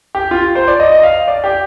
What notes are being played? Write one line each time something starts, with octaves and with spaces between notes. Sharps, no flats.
G4
F4
C5
D5
D#5
D#5
F5
D5
G4